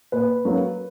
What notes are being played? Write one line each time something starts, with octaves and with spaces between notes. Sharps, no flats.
A#2 B4
F#3 A#3